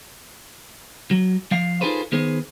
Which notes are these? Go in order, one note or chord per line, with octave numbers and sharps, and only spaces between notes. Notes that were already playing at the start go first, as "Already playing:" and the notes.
F#3
F3 F5
D#4 F4 G#4 A4 B4 C5
D#3 B3 G#4 C5